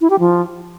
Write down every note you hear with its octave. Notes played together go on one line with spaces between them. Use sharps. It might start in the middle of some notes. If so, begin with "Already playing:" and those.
E4
G4
F3